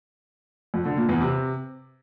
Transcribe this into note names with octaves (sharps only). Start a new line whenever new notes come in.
F2
D3
A#2
E2
C3